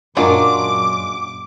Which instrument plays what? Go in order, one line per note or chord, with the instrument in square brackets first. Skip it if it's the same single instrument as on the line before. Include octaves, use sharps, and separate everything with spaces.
[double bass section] F#2 A#2 [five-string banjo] F#3 G#3 F4 [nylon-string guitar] D4 A#4 [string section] D6